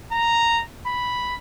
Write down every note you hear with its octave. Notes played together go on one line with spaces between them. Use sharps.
A#5
B5